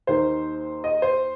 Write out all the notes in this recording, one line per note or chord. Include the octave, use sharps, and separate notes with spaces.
D#2 D#3 A#3 D#4 C5
D#5
C5